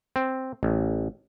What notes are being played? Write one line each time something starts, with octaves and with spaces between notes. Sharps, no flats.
C4
A1